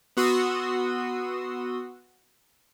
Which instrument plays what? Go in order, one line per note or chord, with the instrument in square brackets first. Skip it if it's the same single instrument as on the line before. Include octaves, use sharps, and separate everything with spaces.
[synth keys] B3 F#4 C6 D#6 E6